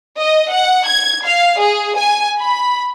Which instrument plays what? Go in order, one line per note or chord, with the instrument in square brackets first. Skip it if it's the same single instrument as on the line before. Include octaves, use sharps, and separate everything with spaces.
[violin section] D#5
F#5
G#6
F5
G#4
G#5
B5